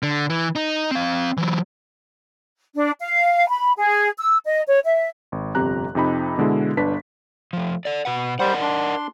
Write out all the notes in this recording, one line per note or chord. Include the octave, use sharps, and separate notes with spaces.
D3
E3
D#4
C4 F5
E3 F#3
D4
F5
B5
G#4
E6
D#5
C#5
E5
G#1
G1 F2 C3 G4 A#5 F#6
F2 C3 D#4 B5
B2 D3 G#3 E4
G1 D4 B4 B6
F3 A3
A4 D5
B2 B4 F#5
G3 A#4 C5 D5 F#5
D4 C6